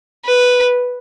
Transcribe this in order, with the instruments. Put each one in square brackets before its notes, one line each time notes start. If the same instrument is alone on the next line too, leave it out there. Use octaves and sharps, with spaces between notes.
[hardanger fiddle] B4